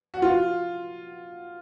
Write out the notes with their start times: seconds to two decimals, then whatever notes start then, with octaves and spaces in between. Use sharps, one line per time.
0.14 F#4
0.22 F4